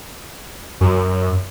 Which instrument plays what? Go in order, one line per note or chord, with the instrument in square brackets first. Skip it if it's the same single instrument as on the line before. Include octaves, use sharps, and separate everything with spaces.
[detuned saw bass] F#2